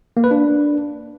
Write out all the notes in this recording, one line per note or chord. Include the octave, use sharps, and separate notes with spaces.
A#3
B4
D4